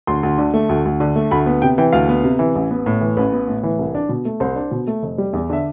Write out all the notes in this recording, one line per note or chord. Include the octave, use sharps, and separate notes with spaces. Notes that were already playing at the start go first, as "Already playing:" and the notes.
D2 C6
D2
D3
A3
D2
D2
D3
A3
D2 B5
B3
C3 G5
E3 G5
D2 F5
B3
C3
E3
A1
B3
A2
E3
A1 B4
B3
A2
E3
C2
D4
B2
A3
C2 C5
D4
B2
A3
F1
G3
E2
D3 E5